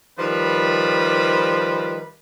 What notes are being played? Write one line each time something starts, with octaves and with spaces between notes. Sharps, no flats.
D#3 F3 G3 B4